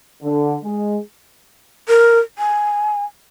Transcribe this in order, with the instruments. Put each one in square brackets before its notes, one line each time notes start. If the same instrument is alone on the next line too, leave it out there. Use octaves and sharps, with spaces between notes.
[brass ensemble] D3
G#3
[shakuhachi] A#4
G#5